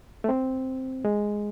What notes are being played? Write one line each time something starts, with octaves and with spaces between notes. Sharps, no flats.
A3
C4
G#3